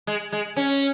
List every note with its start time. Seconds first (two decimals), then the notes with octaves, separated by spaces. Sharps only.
0.07 G#3
0.32 G#3
0.57 C#4